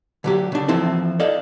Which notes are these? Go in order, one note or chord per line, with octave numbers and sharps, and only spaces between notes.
D3 F#3 G4
C#3 D4
E3 F3 C4 E4 A4
A4 D5 D#5 F5